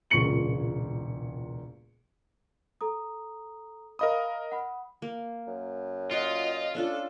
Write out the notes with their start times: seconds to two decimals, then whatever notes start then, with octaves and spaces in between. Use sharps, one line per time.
0.10 E1 C#2 A#2 C#6 C#7 F#7
2.81 A4 A#5 D#6
3.99 A#4 D#5 F5 B5 D#6
4.52 F#5 B5
5.02 A#3
5.47 F#2
6.11 F4 D5 D#5 F#5 G5
6.75 C#4 D4 F4 A4